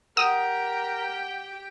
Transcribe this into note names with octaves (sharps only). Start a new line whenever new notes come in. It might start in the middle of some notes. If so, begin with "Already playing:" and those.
G4 A#4 F#5 G5 D#6